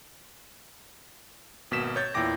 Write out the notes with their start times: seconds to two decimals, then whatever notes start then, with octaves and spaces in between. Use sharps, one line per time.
1.71 G#1 B2 A#3 B6 E7
1.96 C#5 G6 A6
2.14 E2 A#2 E4 G5 D6 A#6